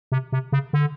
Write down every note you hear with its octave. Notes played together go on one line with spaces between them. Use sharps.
C3
C3
C#3
D3